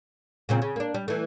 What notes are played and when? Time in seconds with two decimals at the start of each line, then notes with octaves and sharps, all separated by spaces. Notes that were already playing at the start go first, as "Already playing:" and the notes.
0.49 A#2 C#3 C4
0.62 C#3
0.76 A#3 D4
0.94 G3
1.08 E3 A3